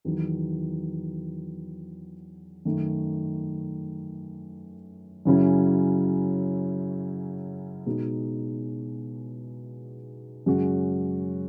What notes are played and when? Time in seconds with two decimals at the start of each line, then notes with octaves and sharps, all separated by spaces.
0.05 E2 D#3 F#3
2.65 F#2 D#3 A3
5.25 F#2 C#3 F#3 C#4 E4
7.86 B2 G#3 D#4 F#4
10.46 F#2 C#3 G#3 C#4 F#4